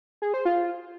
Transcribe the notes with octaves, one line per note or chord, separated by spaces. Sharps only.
G#4
C5
F4